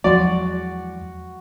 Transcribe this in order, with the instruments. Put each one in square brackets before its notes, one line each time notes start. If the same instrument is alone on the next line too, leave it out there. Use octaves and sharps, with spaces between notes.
[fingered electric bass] E2 G#3 [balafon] F3 F#3 C6 [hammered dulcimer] F#4 [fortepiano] D5